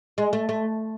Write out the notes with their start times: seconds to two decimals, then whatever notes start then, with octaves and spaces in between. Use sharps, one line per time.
0.18 G#3
0.33 A3
0.49 A3